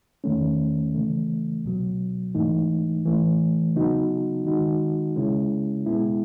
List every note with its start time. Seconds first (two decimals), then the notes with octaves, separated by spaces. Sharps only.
0.24 E2 D#3 A3 C#4
0.94 C#3 E3 A3
1.65 C#2 B2 F#3
2.35 G#2 E3 A3 D#4
3.05 A2 E3 A3
3.76 C#3 F#3 B3 D#4 F#4
4.45 D#3 G#3 D#4 F#4
5.16 C#3 G#3 C#4 E4
5.86 C#2 B2 G#3 B3 E4